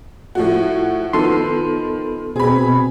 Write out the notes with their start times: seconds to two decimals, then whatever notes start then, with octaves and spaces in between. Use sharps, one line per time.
0.35 A2 F3 F#4
1.13 D#3 F3 B3 A4 B4 C6
2.36 B2 C4 G#4 B5